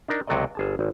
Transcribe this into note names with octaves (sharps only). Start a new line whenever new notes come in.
D4 D#4 A#4
C#2 C3 F#3 A4 D5 D#5
G1 G#4 A5
G#1